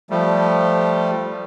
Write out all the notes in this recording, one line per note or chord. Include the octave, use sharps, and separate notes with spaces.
F3 G3 A3